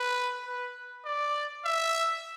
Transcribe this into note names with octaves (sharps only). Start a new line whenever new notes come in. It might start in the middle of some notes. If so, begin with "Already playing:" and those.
Already playing: B4
B4
D5
E5